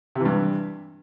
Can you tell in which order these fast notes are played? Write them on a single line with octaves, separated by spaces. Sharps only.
C3 E3 G2